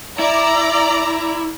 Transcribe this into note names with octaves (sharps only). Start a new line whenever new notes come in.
E4 D5 A#5